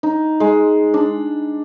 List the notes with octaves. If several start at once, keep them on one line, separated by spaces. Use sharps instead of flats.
D#4
G#3
D4